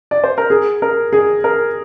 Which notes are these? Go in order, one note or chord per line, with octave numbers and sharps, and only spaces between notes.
D5
C5
A#4
G#4
A#4
G#4
A#4